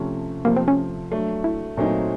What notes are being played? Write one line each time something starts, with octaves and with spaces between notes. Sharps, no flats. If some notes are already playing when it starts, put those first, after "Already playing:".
Already playing: C3 F3 A3 C#4
C3 F3 A3 A#3
C4
C#4
F#3 A3 D4
E4
A#2 F#3 A3 C4 D#4